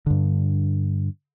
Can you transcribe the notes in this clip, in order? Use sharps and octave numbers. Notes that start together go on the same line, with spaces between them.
G2 D3